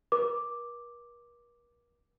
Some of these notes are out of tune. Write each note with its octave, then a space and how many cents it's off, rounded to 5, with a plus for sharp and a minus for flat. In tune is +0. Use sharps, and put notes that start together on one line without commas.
A#4 +45 D6 +0